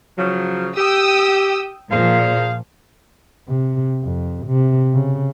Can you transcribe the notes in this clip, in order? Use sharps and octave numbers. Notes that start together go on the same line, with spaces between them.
C#3 F3 F#3
G4 G5 D#6 E6
A#2 F3 G#4 C5 F5
C3
F2
C3
C#3